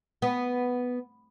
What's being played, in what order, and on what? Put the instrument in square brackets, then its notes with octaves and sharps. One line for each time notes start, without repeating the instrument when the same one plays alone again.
[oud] B3